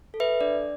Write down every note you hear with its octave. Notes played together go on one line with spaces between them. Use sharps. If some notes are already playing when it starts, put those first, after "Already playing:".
A4
B4 E5
D4 D5